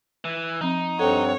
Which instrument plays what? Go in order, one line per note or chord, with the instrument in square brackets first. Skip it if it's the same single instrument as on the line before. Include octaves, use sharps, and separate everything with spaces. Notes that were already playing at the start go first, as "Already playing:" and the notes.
[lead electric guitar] E3
[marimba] F3 C4 [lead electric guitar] D#4
[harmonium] G2 C4 F#5 [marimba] A4 [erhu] C#5